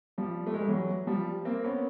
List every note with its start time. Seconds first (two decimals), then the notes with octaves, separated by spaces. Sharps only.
0.18 F3 G3
0.47 A3
0.54 G#3
0.61 G3
0.68 E3 F#3
1.07 F3 G3
1.45 A#3 C4
1.64 B3 C#4